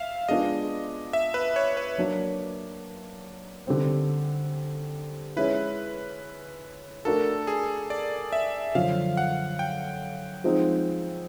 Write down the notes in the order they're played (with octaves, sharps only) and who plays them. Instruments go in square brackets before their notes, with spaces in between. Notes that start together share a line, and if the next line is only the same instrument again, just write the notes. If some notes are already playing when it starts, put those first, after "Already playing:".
Already playing: [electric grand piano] E5 F5
[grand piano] G#3 B3 D4 F4 G#4 [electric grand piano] D#5
[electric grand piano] E5
B4
C#5
B4
[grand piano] F#3 A#3 D4 F#4
D3 G3 C4
[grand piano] G#3 C#4 E4 [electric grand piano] B4
[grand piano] A3 D4 F#4 A#4 [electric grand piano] A4
[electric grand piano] G#4
D5
E5
[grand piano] F#2 D3 F3 [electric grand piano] F5
[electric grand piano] F#5
G5
[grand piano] F3 G#3 C4 D#4